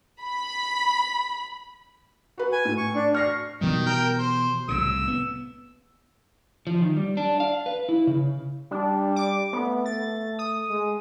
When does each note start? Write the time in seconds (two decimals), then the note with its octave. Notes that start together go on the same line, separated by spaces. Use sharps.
0.22 B5
2.38 F#4 B4
2.52 G#5
2.65 A2
2.77 C#6
2.95 D4
3.14 C#6 F6 A#6 C7
3.61 B2 D#3 E3 G3
3.86 A#4 G5
4.19 C5
4.68 C2 A2 C#3 E6
5.08 B3
6.67 F3
6.81 D#3
6.97 G3
7.17 D4
7.40 F5
7.66 B4
7.89 E4
8.07 C#3
8.71 G3 D4
9.16 D6
9.53 A3 B3
9.86 A6
10.39 D#6
10.69 G#3